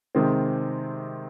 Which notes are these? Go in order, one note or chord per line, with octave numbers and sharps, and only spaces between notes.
C3 D#3 G#3 C4